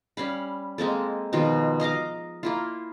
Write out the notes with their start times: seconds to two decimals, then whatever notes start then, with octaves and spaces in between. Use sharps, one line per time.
0.17 G3 C#4 F5 B5
0.78 G#3 A#3 C4 A4
1.33 B2 D#3 F3 F4
1.80 D#5 F5 A#5 D6
2.43 A#3 E4 F4